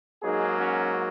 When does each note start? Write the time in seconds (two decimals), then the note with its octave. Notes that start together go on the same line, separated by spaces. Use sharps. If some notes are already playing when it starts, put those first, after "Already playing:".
0.22 G#2 F#3 A#3 D#4 G#4
0.58 C#4 F#4